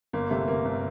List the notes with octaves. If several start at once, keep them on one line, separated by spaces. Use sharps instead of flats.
G1 A#3
C3 A3
G1 A#3
G1